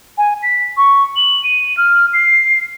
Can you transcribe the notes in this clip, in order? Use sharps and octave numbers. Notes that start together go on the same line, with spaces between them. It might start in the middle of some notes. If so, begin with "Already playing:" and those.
G#5
B6
C#6
F#7
D#7
F6
C7